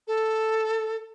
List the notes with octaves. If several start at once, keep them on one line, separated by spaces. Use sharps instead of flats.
A4